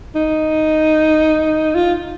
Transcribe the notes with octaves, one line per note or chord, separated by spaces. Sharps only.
D#4
F4